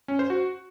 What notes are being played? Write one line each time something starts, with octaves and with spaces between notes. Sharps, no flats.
C#4
C5
F#4